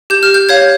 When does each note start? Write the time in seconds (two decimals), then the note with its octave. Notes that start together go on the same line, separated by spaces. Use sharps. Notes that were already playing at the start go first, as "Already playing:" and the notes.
0.10 G4 G6
0.23 F6
0.34 G6
0.49 C#5 F5 G#6